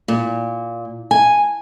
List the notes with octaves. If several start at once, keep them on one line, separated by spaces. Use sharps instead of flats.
A#2
G#5